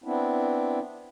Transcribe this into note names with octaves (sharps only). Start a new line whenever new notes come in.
B3 C4 D4 E4